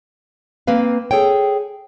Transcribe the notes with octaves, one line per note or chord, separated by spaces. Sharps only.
A#3 C4 B4 F5
G#4 A4 C#5 G5